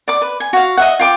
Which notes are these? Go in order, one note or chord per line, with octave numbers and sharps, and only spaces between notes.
D5 D6
B4
G#5
F#4 F5
D#5 E5 F#5
F4 G5 D6